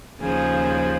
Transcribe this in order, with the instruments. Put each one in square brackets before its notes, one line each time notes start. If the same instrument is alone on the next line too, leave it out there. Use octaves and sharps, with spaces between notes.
[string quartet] D#2 C#3 F3 G#4